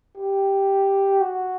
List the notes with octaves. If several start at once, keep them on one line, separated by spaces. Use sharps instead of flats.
G4
F#4